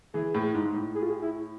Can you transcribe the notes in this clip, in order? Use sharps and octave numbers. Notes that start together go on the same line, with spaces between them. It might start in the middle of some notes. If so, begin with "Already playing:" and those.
E3 G#4
A2
G#2
G#2
A2
G#4
F4
G#4
E4